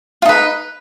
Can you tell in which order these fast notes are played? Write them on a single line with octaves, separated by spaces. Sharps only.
F4 D#4 B4